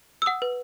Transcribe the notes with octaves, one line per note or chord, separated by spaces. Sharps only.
E6
F#5 D#6
B4